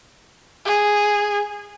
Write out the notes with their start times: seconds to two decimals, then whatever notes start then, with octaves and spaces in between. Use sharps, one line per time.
0.65 G#4